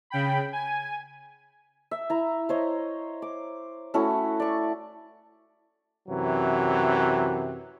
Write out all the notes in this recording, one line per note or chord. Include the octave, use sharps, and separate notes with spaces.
C#3 G5 B5
G#5
E5
E4 A#5
C5 C#5 D#5
D6
A3 C#4 E4 F#4
D5 C#6
F#2 C3 E3 F#3